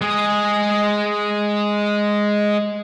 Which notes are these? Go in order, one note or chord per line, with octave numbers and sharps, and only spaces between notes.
G#3 G#4